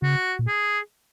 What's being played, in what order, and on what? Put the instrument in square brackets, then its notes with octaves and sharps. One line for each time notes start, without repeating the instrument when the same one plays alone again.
[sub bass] C#3 [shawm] F#4
[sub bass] A#2
[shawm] G#4